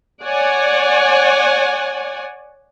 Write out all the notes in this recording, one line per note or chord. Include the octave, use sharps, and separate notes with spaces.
C#5 D5 F#5 G#5